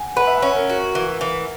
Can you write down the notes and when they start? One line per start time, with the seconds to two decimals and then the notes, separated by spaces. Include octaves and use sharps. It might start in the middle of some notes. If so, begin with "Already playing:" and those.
Already playing: F#5 G#5
0.17 B4 F#5
0.27 E5
0.38 C#4 F#5
0.56 A#4
0.69 F#4
0.95 E3
1.21 E3